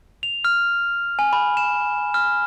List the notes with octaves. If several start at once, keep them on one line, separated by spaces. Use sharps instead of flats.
F7
F6
G#5
B5
E7
F6